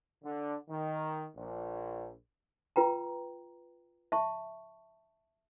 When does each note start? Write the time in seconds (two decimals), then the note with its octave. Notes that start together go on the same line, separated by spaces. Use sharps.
0.24 D3
0.69 D#3
1.36 A#1
2.76 F4 B4 G5 A#5
4.12 E5 A5 C#6